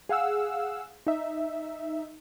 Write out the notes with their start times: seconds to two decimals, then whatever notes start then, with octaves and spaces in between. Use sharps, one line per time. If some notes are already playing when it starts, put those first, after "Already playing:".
0.09 G#4 F5 F#5 E6
1.07 D#4 E5